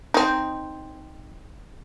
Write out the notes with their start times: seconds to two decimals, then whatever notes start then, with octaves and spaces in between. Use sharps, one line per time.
0.14 C4 D#4